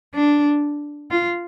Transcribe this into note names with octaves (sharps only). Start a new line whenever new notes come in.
D4
F4